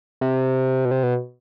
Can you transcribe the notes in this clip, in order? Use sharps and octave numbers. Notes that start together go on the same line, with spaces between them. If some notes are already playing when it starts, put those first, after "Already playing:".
C3
B2
C3
B2